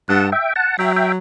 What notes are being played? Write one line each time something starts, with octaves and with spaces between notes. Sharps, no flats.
G2 F#5 A5
E5 G5
F#5 A5
F#3 E5 G5
E5 G5